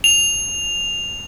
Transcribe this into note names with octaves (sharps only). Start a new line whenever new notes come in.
F7